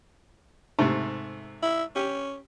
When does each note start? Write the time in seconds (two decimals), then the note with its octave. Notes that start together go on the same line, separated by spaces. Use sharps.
0.79 G#2 C3 A3
1.63 E4
1.96 C#4 G4